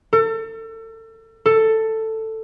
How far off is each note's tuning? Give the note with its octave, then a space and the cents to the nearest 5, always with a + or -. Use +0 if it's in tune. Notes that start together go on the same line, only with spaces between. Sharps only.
A4 +35
A4 +10